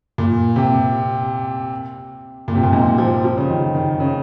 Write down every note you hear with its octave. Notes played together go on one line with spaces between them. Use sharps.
A#2
C3
A#2
C3
A#2
G#2
F3
F3
C#3
D#3
D#3
C#3